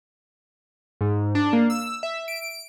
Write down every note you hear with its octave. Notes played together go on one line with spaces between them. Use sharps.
G#2
D4
A#3
E6
E5
D7